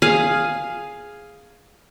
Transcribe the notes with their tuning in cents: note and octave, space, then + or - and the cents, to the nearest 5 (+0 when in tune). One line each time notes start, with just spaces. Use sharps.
G#4 +0 F5 +0